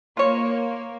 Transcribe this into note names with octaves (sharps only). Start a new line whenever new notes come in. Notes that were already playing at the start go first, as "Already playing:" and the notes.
A#3 F4 C#5